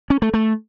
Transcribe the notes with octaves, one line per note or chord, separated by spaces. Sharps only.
C#4
A3
A3